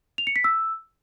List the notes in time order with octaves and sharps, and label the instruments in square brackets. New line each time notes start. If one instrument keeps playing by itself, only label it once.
[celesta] F7
C#7
B6
E6